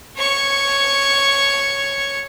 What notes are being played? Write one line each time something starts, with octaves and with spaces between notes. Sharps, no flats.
C#5 C#6